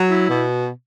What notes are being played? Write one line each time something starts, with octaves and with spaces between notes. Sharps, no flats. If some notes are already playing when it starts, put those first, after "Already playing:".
Already playing: F#3
E4
B2